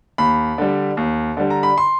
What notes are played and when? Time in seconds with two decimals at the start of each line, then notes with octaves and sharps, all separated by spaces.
0.18 D#2 B5
0.58 D3 G3
0.97 D#2
1.37 D3 G3
1.50 A#5
1.63 B5
1.78 C6